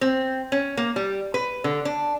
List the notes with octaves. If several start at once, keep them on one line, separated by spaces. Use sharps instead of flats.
C4
C#4
A#3
G3
B4
D3
D4